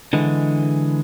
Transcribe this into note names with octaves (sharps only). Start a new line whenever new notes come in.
D3 E3 G#3